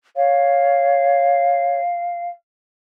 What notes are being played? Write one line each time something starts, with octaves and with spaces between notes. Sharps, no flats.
C#5 F5